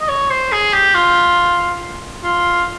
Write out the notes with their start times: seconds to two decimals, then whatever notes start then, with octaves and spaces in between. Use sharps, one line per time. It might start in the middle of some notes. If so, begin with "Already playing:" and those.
0.01 D#5
0.09 C#5
0.31 C5
0.52 G#4
0.74 G4
0.95 F4
2.24 F4